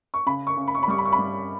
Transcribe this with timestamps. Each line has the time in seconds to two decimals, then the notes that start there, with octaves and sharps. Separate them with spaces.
0.14 C#6
0.26 C#3 B5
0.47 C#6
0.57 C#3
0.67 B5
0.75 C#6
0.83 B5
0.88 G3 C#6
0.98 B5
1.05 C#6
1.12 B5
1.19 G3